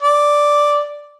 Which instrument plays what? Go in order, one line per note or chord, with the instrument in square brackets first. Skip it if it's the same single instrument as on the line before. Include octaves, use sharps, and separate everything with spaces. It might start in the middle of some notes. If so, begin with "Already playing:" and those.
[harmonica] D5